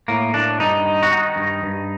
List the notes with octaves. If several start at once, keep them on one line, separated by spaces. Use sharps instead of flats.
A2 A#3
A2 D4
G2 D#4
D#3
F#4
D#3 D#4
G2
G2